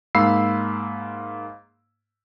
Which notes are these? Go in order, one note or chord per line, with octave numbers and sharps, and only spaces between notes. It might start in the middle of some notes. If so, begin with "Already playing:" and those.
G#2 A#3 F5 B5 E6 C7